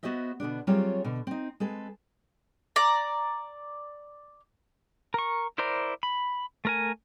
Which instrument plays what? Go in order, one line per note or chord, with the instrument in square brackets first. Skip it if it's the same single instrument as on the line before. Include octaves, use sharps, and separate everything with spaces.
[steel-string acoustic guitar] B3 F#4 C5 D#5 E5
B2 D3 B3 D4
F#3 G3 C4 F4 G#4 C#5
B2 D3
C4 D#4
G#3 C4 A4 B4
[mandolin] D5 A#5
[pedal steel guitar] A#4 C#6
E4 A#4 C5 D5 A#5
B5
A3 A#4 G#5